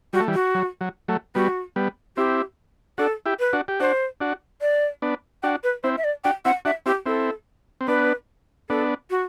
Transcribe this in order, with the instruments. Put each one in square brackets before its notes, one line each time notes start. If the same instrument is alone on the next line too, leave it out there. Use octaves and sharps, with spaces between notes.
[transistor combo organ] G3 [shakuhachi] F#4
[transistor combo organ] A3
E3 G3
[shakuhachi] F#4
[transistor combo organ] F#3
F#3
F#3 A3
[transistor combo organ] G3 B3 [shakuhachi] F#4
[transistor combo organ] G3 B3
[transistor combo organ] C4 E4 [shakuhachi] G4
[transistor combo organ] D4 F#4 [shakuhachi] A4
[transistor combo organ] E4 G4
[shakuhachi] B4
[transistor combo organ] D4 F#4
G4
[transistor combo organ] D4 F#4 [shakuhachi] C5
[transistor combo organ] D4 F#4
[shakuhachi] D5
[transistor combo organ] B3 D4
[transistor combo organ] D4 F#4 [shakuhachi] G5
[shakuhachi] B4
[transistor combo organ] C4 E4 [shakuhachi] C5
[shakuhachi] E5
D5
[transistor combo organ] D4 F#4 [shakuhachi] G5
[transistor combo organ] C4 E4 [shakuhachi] F#5
[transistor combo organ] D4 F#4 [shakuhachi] E5
[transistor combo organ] C4 E4 [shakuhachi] G4
[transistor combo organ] C4 E4 [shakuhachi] A4
[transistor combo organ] C4
[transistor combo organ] B3 D4 [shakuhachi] B4
[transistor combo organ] B3 D4 [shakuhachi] A4
[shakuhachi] F#4